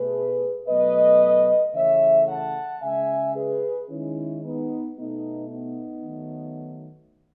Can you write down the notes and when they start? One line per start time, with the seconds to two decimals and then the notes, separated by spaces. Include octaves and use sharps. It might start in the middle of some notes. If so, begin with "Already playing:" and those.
Already playing: B2 A3 G#4 B4
0.68 B2 F#3 A3 B4 D#5
1.74 C#3 E3 A3 C#5 E5
2.28 F#5 A5
2.82 C#3 G#3 E5 G#5
3.36 G#4 B4
3.90 D#3 G#3 C#4 E4
4.43 B3 D#4
4.96 B2 A3 B3 D#4
5.50 B3 D#4
6.04 D#3 F#3 A3